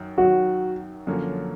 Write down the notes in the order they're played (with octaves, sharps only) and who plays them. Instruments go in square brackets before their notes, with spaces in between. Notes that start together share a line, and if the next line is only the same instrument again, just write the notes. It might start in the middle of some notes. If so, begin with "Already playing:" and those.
Already playing: [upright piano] F#2 D#3
[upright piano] F#2 D#3 F#3 [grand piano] F#4
[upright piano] F#2 D3 F3 A#3 C#4